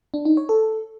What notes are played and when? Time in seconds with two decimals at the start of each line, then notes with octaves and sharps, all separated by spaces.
0.14 D4
0.25 D#4
0.37 C#5
0.49 A4